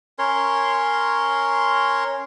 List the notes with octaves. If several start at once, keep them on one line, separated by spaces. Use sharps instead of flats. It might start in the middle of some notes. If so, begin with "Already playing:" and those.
C#4 A#4 C#5 C6